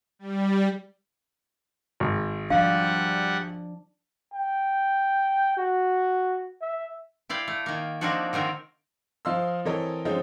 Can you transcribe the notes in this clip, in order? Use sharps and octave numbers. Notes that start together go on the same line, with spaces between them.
G3
G#1
F3 G3 D4 F5 F#5
G5
F#4
E5
E4 D5 F5 G5
A3
D#3 A#3
F3 A#3 C4 D4 D#4 F#4
D3 D#3 C4 A#4
F3 D#5 F5 C6 E6
E3 C4 A4 A#4 C#5 D#5
D3 F3 G#3 C4 C#4 D#4